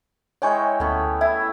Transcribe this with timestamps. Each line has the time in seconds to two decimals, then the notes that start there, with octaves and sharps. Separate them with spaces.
0.42 E3 G#3 C#5 G5 G#5 C#6
0.80 D2 A3 B3 C#4
1.21 E4 E5